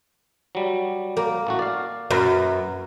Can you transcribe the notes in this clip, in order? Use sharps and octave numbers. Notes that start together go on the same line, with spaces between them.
F#3 G3
A#3
A1 A3 F#4
D5 F5
F#2 B4 A#5